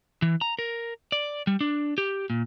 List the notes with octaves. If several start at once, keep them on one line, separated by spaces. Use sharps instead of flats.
E3
A#5
A#4
D5
G3
D4
G4
A#2